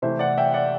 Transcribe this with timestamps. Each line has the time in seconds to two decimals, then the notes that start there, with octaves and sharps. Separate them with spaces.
0.02 C3 E3 A3 C5 E5
0.19 D5 F#5
0.38 E5 G5
0.54 D5 F#5